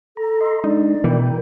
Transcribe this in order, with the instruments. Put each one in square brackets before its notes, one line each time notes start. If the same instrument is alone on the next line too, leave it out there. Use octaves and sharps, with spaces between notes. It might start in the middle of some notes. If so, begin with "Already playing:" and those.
[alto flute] A4 [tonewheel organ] A#5
[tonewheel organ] D#5 A#5 C6
[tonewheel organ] G#3 D4 [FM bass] D#4 [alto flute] D5
[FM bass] B2 [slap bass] E3 [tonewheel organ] A#4 G5